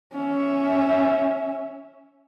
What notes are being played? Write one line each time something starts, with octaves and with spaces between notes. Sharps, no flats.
C#4 E5